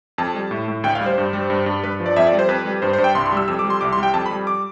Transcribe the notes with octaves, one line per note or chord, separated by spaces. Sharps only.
F2 A5
G3
A2
A2
D2 G5
F5
G3
C5
G2
G3
G2
G2
G2 B4
F3
D5
F2 E5
D5
G3
C5
F2 B4
G3
G2 C5
C5
G2
G5
C2 C6
C6
G3 E6
F2 E6
D6
G3
C6
C2 D6
C6
G3
G5
F2 A5
B5
G3
D6